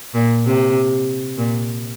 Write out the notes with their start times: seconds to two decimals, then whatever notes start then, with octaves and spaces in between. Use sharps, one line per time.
0.14 A#2
0.45 C3
1.38 A#2